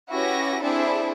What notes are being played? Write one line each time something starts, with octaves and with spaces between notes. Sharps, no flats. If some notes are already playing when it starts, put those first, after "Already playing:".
C#4 E4 F#4 G4 B4 A#6
C4 D4 E4 G#4 A4 C5